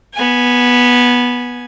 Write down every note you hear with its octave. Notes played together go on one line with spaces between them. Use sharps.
B3 G#5